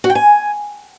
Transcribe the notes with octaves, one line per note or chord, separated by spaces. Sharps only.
F#4
G5
G#5